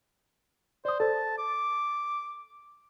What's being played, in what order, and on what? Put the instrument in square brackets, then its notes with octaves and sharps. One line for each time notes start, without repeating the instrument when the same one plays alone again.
[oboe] C5 [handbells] D5 D#6
[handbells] A4 C5 [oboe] A5
[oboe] D6